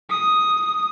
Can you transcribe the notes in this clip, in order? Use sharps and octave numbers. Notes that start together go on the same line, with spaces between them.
D#6